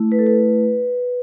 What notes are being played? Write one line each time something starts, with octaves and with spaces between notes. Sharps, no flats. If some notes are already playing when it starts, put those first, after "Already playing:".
Already playing: A3 E4
B4
A4
B4